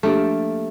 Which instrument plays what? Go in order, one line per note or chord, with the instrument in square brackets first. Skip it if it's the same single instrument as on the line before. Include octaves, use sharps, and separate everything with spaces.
[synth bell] F3 A#3 D4 G4 [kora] A3